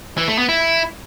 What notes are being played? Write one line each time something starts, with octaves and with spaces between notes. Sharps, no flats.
E3
A3
B3
E4